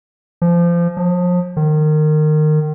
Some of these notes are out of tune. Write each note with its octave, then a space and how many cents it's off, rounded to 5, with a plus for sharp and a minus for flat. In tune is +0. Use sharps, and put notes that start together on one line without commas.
F3 -25
F3 +35
D#3 -25